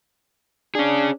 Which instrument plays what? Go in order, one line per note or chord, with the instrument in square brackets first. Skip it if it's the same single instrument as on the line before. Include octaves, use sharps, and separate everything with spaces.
[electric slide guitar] C#4 G#4 [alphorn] D4